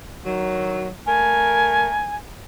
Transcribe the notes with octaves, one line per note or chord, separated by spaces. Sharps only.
D#3 F#3
A3 A#4 G#5